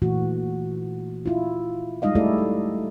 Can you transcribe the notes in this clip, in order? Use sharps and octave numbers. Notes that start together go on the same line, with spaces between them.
A#2 E3 A3 F#4
E4 F4
G3 G#3 D#4 D#5 F5
A3 E4 G4 A4 D5
D#4